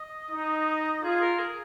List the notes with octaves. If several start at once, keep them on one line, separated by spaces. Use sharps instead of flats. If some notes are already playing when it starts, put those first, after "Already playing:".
Already playing: D#5
D#4
F4 G#4
A#4
G#4